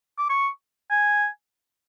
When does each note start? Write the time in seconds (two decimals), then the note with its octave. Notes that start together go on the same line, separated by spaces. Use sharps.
0.18 D6
0.30 C#6
0.90 G#5